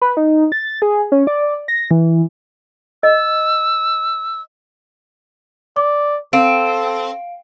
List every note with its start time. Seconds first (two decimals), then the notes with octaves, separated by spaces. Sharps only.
0.02 B4
0.17 D#4
0.52 A6
0.82 G#4
1.12 C#4
1.27 D5
1.68 A#6
1.91 E3
3.03 D#5 E6
5.76 D5 D6
6.33 C4 A4 F5 D7